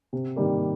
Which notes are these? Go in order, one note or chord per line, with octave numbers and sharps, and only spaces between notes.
C3
D#3 G3 A#3